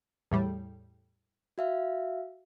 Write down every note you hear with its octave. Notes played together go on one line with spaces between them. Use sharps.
E2 A2 G3
F#4 E5 F5